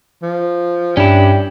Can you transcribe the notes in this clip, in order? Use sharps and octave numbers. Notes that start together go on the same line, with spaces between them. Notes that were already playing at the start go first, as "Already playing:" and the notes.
F3
G2 C#4 D4 E4 G4